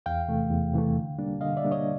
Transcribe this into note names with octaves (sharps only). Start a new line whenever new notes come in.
E2 F5 G5
C3 E3 A3
E2
C3 E3 A3
D3
G3 A#3 D4
D3 D#5 F5
D5 E5
G3 A#3 D4
C#5 D#5